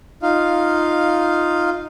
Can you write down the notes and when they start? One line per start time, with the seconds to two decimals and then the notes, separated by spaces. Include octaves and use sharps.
0.22 D#4 F4 F5